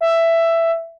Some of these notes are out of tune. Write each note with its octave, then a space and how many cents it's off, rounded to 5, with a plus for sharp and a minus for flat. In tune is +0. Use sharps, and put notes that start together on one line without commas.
E5 +10